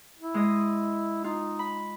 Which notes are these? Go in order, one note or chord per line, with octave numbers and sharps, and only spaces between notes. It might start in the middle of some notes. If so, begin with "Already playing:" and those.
E4
G#3 D#5
D#4 F4
B5